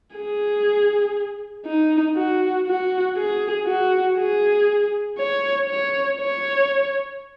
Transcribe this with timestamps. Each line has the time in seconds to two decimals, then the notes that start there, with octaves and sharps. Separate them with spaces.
0.16 G#4
1.66 D#4
2.16 F#4
2.67 F#4
3.17 G#4
3.66 F#4
4.16 G#4
5.18 C#5
5.67 C#5
6.18 C#5